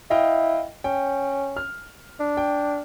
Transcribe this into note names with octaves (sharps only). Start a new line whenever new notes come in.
E4 D#5 F5 G5
C#4 G5
F6
D4
G5